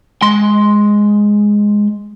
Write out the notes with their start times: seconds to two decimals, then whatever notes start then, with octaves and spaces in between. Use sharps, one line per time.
0.22 G#3 C6